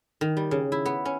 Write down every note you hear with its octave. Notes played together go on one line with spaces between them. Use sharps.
D#3
G3
C#3
E4
B3
C#4